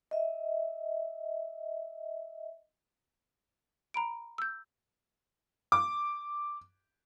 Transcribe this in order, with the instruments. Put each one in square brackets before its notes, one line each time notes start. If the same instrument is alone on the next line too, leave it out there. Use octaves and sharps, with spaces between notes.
[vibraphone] D#5 E5
[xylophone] A#5 B5 D7
E6 G6
[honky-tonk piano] D6